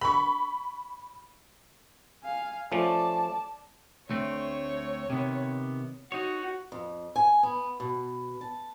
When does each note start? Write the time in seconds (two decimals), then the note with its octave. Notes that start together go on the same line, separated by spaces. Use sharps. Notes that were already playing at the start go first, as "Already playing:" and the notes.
0.01 B5 C#6
2.23 F5 G#5
2.72 F3 A3 C#4 D5 A5
4.10 D2 A3 C4 C#5
5.10 C3 D#3 B3
6.12 D#4 F#4 C#5
6.72 F2
7.16 G#5
7.43 B3
7.80 B2
8.41 A5